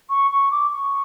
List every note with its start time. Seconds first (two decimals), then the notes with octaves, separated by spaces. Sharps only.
0.09 C#6
0.30 C#6
0.51 D6
0.70 C#6